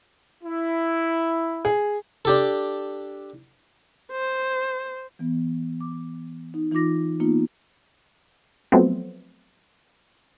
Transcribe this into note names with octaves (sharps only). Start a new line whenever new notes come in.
E4
G#4
D4 G4 A4
C5
E3 B3
D6
D#4
E3 D#4 F4 D6 A#6
A#3 B3 D#4 F4
F3 F#3 A3 B3 C4